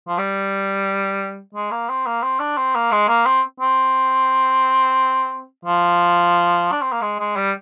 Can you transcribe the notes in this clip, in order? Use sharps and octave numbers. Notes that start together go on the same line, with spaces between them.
F3
G3
G#3
A#3
C4
A#3
C4
D4
C4
A#3
G#3
A#3
C4
C4
F3
D4
C4
A#3
G#3
G#3
G3